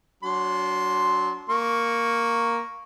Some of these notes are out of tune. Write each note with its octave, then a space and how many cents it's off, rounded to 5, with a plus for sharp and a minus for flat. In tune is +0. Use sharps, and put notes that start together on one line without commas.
F#3 +0 D4 -30 C6 +0
A#3 +0 C#6 +0